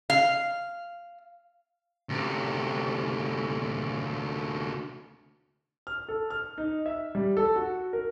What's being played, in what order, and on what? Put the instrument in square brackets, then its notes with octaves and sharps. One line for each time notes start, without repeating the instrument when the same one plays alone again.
[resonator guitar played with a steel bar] F5
[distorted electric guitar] D2 C3
[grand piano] F6
A4
F6
D#4
E5
G3
A4
F#4
A#4